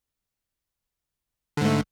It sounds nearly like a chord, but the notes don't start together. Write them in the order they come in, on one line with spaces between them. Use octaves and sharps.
D3 G#2 A3